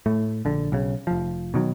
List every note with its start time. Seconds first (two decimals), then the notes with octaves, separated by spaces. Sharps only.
0.06 A2 A3
0.45 A#1 D3
0.72 B1 C#3
1.07 F1 F3
1.54 B2 D#3 F#3